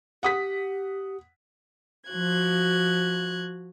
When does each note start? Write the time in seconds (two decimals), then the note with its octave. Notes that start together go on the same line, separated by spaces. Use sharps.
0.23 G4 F#5 D#6 B6
2.08 F3 F#4 F#6 G#6